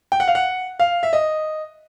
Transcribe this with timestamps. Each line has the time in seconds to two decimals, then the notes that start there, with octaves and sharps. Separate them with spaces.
0.12 G5
0.20 F#5
0.28 F5
0.35 F#5
0.80 F5
1.03 E5
1.13 D#5